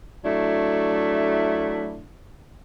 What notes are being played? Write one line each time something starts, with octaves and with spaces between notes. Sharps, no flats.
F#3 A3 D4 E4